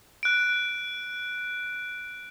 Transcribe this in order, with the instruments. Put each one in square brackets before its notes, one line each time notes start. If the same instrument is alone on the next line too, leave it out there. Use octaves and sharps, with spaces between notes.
[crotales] F#6 D7